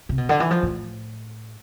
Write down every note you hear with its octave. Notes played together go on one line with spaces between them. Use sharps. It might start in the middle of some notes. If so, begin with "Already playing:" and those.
C3
B2
D3
E3
F3
A2